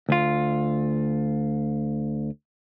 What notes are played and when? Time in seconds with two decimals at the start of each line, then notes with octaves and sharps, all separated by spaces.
0.09 D2 F4